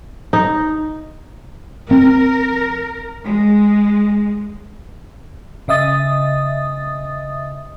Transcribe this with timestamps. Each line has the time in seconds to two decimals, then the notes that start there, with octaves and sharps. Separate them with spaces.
0.33 D#4
1.91 C4 A#4
3.25 G#3
5.68 C#3 D#5 E5 D#6 A6